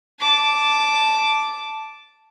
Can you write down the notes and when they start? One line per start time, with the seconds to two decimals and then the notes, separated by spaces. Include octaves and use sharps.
0.20 A5 D6